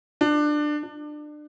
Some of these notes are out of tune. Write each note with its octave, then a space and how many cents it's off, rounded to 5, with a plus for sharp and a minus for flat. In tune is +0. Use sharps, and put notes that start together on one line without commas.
D4 +20
D4 +30